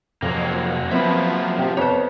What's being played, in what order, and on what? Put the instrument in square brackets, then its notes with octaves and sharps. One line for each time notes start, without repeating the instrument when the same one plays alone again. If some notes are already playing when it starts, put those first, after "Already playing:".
[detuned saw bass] F2 [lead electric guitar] C3 F3 [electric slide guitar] F#3 A#3
[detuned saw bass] F3 [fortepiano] B3 C4 [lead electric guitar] E5 B5
[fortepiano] C3 G4
[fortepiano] F2 B3 [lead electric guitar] C5 C#5